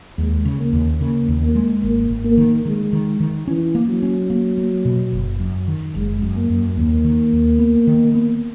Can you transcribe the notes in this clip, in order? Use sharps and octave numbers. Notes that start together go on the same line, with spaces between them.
D#2 G#3
C#3
A#3
D#2
C#3 A#3
D#2
A#3
G#3
G#1 A#3
G#1
A#3
D#3
D#3 G#3
D#3
D#3
E3 C#4
A#3
F#3
C#4
A#3
A#3
B2
F#1
F#2
D#3
F#1 G#3
F#2
A#3
F#2
D#2 A#3
D#3
D#2
B3
D#3
B3